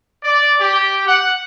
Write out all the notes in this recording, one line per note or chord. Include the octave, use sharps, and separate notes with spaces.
D5
G4
F#5